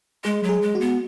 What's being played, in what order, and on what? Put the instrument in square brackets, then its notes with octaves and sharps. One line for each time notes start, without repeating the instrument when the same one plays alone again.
[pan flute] G#3 [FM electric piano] G#4
[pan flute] F#3
[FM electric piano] G#4
[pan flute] G#3
[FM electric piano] F#4
[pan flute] B3